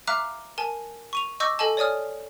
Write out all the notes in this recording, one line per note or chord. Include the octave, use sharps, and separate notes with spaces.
E5 F5 A#5 D6 F6 F#6
A#4 G#5 A5
C#6 D#7 F7
D#5 C#6 D6 E6 G6 A#6
A4 D#5 G#5 A5
C#5 D5 G#5 D#6 F6